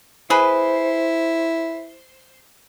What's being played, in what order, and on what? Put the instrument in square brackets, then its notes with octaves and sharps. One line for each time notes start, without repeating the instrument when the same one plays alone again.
[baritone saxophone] E4 [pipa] G#4 B4 [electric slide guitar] C5